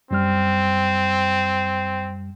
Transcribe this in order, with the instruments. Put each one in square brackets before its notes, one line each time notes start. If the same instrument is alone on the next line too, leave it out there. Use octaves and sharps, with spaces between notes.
[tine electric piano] F#2 G3 F6 [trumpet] C4